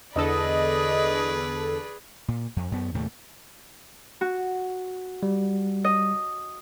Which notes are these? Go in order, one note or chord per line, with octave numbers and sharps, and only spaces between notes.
E2 D3 G#4 A4 B4 D5 D#5
A#2
F2
F#2 B3
D#2 A2 C3 A3
F#4
G3
D#5